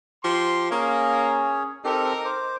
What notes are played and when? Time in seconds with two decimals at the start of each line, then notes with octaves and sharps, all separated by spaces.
0.24 F3 G4 C6
0.71 A#3 C#4 G#4 C#5
1.85 C4 D#4 G4 A4 A#4
2.25 C5 D6